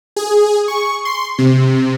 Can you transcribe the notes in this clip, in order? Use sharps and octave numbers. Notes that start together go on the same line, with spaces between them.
G#4
C#6
C6
C3